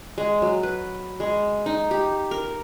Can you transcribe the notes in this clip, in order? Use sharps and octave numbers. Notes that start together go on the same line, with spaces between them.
G#3
F#3
B4
G#3
D#4
G4
A#4